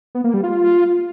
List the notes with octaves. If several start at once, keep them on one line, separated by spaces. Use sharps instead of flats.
B3
A#3
G3
F4